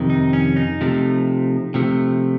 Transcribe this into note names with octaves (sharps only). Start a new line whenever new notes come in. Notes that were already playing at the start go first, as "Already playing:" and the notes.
Already playing: F2 C3 D#3
D#4
C#4
D#4
C3 F3 A3
C3 F3 A3